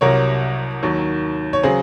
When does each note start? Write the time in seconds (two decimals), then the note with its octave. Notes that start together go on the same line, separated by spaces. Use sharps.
0.01 C2 C3 F#3 A#4 C#5
0.83 D#2 D#3 F#3
1.53 C#5
1.63 C#3 F#3 G#4 C5